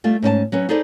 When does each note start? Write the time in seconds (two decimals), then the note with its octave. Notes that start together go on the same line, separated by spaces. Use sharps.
0.04 G3 A3 F4
0.22 G#2 C#4 B4 A5
0.52 F#3 C#4 B4
0.69 D#4 G#4 A4 B4 C5 D5